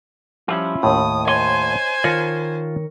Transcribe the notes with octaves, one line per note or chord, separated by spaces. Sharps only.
F3 G3 C#4 E4 F4
D#2 A2 D#6
C5 C#5 D#5 G#5 C6
D#3 F4 A#4 C#5 A5